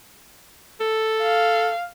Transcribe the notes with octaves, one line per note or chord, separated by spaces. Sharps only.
A4
F5